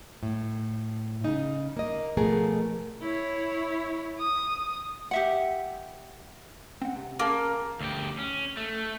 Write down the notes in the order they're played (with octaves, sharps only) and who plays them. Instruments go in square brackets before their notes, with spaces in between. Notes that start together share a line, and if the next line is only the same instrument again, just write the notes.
[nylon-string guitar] A2
C#3 D#4
A#3 D#5
B2 F3 A3 B3 G#4 A#4
[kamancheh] E4 C#5
D#6
[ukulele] G4 E5 F#5
[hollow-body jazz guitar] C4 F#5
C3
[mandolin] A#3 [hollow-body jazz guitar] C#4 G#4 A5
[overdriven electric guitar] D2 G4
C#4
A3